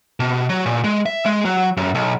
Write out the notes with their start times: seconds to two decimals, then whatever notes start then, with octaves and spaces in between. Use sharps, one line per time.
0.20 B2
0.49 F#3
0.66 A#2
0.84 G#3
1.06 E5
1.26 G#3
1.45 F#3
1.77 F#2
1.95 B1